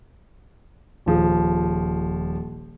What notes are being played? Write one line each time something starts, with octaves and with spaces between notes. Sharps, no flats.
D#1 F3 G#4